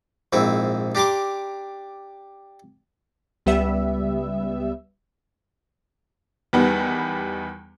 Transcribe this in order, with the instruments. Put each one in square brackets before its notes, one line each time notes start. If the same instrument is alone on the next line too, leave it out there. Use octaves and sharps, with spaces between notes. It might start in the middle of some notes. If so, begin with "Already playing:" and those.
[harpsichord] A#1 G#2 C4 E4
D4 G4 A#5 C6 D6
[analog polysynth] C#2 G3 B3 E5
[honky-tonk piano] E2 D#3 G3 B3